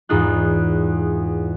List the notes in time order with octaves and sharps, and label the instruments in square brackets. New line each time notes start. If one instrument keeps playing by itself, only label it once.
[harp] E2 G#2 D#4 F4 F#6